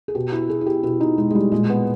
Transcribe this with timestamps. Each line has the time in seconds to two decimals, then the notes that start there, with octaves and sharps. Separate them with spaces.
0.08 G#4
0.15 B2 G4
0.32 E4
0.49 B2 G#4
0.61 E4
0.66 G4
0.83 B2 E4
1.00 D#4
1.17 B2 G#3
1.31 G#3
1.35 G3
1.52 A#2 G#3
1.70 B3